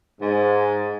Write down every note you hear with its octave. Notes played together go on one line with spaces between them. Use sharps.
G#2